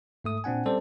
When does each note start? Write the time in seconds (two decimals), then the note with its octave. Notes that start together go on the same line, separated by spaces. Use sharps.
0.24 G#2 A3 D#6
0.44 A#2 C4 D4 F#5 G#5
0.65 G3 C4 C#4 A4 C5 D5